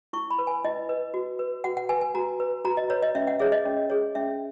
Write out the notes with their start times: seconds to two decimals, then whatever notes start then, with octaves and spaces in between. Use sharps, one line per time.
0.13 E4 C#6
0.30 B5
0.39 B4
0.47 G#5
0.64 E4 D#5
0.89 B4
1.14 F#4
1.39 B4
1.64 F#4 F#5
1.77 F#5
1.89 B4 G#5
2.01 G#5
2.15 F#4 A#5
2.40 B4
2.65 F#4 A#5
2.77 D#5
2.90 B4 C#5
3.02 D#5
3.15 C#4 E5
3.27 F#5
3.39 G#4 C#5 E5
3.52 D#5
3.65 C#4
3.90 G#4 C#5
4.15 C#4 E5